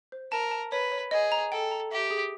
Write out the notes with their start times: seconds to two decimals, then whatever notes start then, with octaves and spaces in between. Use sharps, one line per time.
0.12 C5
0.31 A#4 A5
0.51 A5
0.71 B4 C#5
0.92 C#5
1.11 G#4 D#5
1.32 A#5
1.52 A4 G5
1.71 A#5
1.91 G4 E5
2.11 G#4